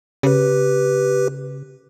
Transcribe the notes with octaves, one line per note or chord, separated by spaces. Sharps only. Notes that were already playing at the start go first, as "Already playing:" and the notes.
C#3 G4 B4